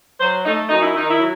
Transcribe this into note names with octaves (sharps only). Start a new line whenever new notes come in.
F#3 C5
A3 D#4
F#2 D#4
E4
D#3 D#4
E4
F#3